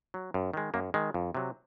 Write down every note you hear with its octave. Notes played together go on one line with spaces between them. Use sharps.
F#3
F#2
D#3 G#3
F#2 A#3
D#3 G#3
F2
C3 F#3